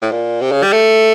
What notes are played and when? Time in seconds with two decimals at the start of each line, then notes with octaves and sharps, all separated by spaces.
0.02 A2
0.11 A#2
0.41 C3
0.52 C#3
0.63 G3
0.72 A3